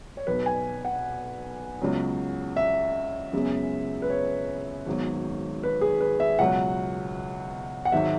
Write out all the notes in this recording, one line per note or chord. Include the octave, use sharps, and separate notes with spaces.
C#5
B1 B2 B3 B4
G#5
F#5
C#2 C#3 F#3 B3
E5
F#2 C#3 G#3 B3
B4
C#5
G#1 G#2 F#3 B3
B4
G#4
B4
E5
C#2 B2 F#3 F#5
F#5
G#1 G#2 F#3 E5